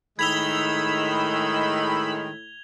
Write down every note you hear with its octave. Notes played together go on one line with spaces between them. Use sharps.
A2 D#3 G#3 B5 E6 G#6 F7 G7